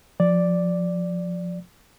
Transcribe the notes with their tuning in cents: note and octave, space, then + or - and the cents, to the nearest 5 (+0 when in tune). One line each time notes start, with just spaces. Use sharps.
F3 +15 D5 +0